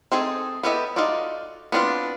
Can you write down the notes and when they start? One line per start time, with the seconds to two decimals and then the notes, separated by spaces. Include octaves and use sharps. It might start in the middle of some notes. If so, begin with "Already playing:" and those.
0.12 C4 D#4 G#4 A4
0.63 B3 E4 G4 A4 D#5
0.96 D#4 F4 F#4 A4 D5
1.72 B3 C4 D4 D#4 F4